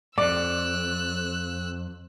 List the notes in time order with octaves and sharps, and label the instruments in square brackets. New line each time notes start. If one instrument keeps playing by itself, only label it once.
[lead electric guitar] F2 G#2 [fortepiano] D5 [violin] E6 F#6